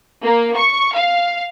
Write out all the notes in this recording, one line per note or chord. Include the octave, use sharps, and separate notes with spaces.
A#3
C#6
F5